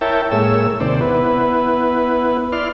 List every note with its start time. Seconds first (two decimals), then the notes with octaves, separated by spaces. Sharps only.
0.01 E4 A#4 C#5 E5 G5 A5
0.31 A2 G#3 A#3 C#5 E6
0.80 D#2 C3 C5 D5
1.01 B3 E4 B4
2.52 E4 D5 C6 F6